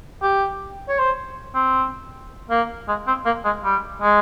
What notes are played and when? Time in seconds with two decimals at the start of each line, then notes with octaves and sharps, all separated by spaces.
0.22 G4
0.89 C#5
0.99 C5
1.55 C4
2.50 A#3
2.88 G#3
3.07 C4
3.26 A#3
3.45 G#3
3.65 G3
4.02 G#3